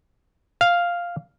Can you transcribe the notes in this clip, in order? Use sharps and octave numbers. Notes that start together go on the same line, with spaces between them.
F5